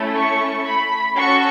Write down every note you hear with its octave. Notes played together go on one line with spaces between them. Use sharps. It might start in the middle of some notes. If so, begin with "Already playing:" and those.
Already playing: A3 C#4 E4 A4
C#6
B5
C#4 F#4 A4 C#6